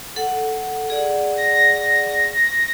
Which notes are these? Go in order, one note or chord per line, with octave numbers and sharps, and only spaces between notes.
A4 F#5
G#4 D5 F#5
A#6